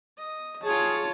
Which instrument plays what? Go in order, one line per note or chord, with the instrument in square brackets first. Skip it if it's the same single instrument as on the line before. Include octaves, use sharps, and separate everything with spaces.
[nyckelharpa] D#5
[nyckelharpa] F4 A5 [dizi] G#4 [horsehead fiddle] C#5